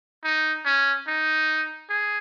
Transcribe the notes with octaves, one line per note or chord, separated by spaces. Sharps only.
D#4
C#4
D#4
G#4